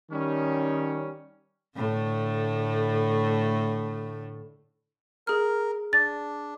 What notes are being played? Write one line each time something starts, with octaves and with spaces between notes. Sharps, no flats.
D#3 G3 C#4
A2 D3 A3
G#4 A#4 F6
D4 A6